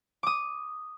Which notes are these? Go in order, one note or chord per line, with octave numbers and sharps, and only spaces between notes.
D6 D#6